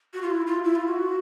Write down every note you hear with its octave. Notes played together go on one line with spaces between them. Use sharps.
F#4
F4
E4
F4
E4
F4
F#4